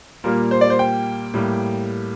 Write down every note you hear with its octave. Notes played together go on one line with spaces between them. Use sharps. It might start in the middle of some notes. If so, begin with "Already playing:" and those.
A#2 G3 A#3 A#4
C5
D5
C5
G5
A2 G3 A#3